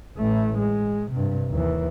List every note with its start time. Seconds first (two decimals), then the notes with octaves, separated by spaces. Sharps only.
0.17 A1 A3
0.58 G#3
1.12 G2 C3
1.50 D#2 E3